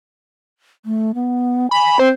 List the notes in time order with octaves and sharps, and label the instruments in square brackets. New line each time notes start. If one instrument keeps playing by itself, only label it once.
[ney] A3
B3
[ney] G#5 [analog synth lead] B5
[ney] C4 [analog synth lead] C5